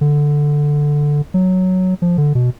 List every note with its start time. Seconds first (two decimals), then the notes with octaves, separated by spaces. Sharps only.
0.01 D3
1.34 F#3
2.02 F3
2.18 D3
2.35 B2